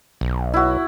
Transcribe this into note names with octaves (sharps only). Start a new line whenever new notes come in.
B1
E4 F#4